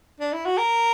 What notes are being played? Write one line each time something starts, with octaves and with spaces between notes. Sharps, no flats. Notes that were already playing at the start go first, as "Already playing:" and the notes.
D4
E4
F#4
A#4